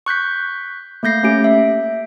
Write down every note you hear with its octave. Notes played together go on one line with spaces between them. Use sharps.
C#6 F#6 G6 B6
A3 A#3 G6 A#6 C7
A3 C#4 G4 D7
E5